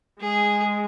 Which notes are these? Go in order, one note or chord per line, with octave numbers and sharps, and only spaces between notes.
G#3 G#4